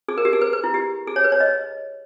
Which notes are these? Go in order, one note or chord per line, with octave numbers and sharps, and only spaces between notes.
G#4
A#4
G4
G#4
B4
B4
E4
G4
G#4
C#5
B4
C#5
D#5